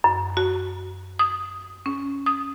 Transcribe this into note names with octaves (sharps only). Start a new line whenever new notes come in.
F#2
F#4
D#6
C#4
D#6